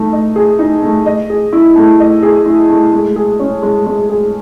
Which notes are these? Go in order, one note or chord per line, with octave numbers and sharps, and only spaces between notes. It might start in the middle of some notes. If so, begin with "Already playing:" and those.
Already playing: A3 D#4
D#5
G#4
D#4
A3
D#5
G#4
E4
A3
D#5
G#4
E4
A3
G#3
G#4
C#4
G#3
G#3
G#4